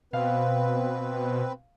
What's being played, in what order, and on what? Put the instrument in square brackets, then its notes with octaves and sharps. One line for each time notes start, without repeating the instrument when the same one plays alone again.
[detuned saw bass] B2 [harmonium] C4 B4 [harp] F5